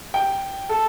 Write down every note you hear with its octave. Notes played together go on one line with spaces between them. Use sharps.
G5
A4